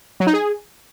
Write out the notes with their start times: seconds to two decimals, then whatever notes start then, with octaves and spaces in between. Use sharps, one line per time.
0.20 F#3
0.27 D#4
0.33 G#4